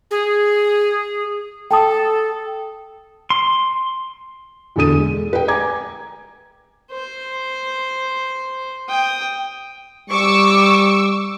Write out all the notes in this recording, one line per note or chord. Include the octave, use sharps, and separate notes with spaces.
G#4
A4 G5 A5 D#6
C6
E2 B2 D3 A4 D#6 D#7
G#3
B4 G5
G#5 A#5 D6 G#6
C5
G5 D#6
G3 C#6 D6 E6